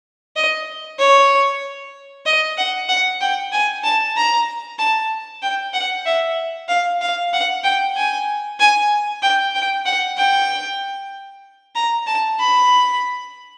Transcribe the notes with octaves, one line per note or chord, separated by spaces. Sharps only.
D#5
C#5
D#5
F#5
F#5
G5
G#5
A5
A#5
A5
G5
F#5
E5
F5
F5
F#5
G5
G#5
G#5
G5
G5
F#5
G5
A#5
A5
B5